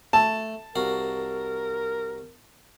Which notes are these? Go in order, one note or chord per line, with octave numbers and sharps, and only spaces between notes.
A3 A5
C2 F#4 A#4 F5